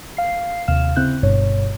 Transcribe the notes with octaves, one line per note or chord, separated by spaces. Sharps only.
F5 C7
D#2 C3 F5 F6 E7
C#3 C4 E4 F#6 G6
G1 G2 B2 C#5